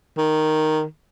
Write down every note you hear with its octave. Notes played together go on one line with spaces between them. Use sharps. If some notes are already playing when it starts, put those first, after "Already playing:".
D#3